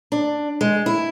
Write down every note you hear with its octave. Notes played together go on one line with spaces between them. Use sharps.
D4
G#3
E4